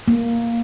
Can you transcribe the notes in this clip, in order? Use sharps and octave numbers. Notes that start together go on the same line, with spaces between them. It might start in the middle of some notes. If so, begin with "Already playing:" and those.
A#3